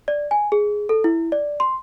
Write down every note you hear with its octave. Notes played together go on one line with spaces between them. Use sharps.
D5
G#5
G#4
A4
E4
D5
C6